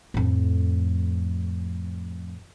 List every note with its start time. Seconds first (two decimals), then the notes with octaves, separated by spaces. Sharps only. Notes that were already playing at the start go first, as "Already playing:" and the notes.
0.14 F2 A2